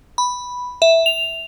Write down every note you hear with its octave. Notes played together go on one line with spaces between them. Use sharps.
B5
E5
F7